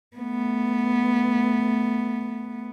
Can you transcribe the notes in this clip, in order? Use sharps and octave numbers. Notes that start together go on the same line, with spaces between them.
A3 B3